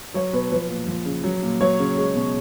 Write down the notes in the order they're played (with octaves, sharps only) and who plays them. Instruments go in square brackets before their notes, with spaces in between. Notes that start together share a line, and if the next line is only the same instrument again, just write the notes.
[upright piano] F#3 C#5
B2 B4
F3 B4
A#2
F3
C#3
F#3
A#2
F#3 C#5
C#3
G#3
B2